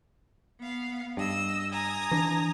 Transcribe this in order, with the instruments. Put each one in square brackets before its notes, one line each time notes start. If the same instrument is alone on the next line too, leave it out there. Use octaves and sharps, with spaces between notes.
[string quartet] B3 F5
[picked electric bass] G2 [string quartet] D#5 E6
[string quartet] G#5 A#5 D#6
[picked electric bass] E3 D4